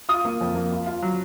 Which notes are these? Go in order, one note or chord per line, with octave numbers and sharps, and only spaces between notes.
F4 D#6
A#3
F2
A#3
F4
F4
F#3